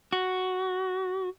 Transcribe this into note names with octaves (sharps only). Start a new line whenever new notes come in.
F#4